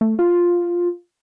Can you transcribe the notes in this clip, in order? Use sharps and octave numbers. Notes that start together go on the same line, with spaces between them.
A3
F4